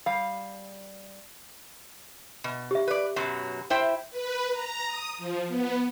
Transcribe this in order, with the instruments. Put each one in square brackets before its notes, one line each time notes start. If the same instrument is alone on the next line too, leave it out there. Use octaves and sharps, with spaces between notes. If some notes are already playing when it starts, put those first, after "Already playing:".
[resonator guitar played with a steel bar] G3 F5
B2
[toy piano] G4 E5
[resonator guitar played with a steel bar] B4 D5
F#2 B2 F#3
E4 C5 G5
[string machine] B4
A#5
D#6
F3
B3